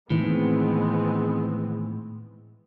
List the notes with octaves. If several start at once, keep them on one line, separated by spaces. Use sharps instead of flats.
A2 D#3 E3 G#3 B3 C4